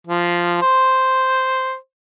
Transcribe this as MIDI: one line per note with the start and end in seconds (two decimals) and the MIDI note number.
0.07 0.58 53
0.61 1.75 72